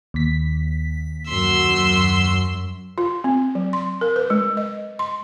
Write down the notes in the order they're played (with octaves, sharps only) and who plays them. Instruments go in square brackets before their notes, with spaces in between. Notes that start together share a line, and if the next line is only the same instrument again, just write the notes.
[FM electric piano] D#2 B6
[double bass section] F#2 F#3 [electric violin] C6 E6
[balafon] F4
C4
F#3
C6
A#4
B4
G#3
D#5
C6